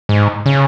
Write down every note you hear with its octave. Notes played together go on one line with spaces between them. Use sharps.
G#2
C#3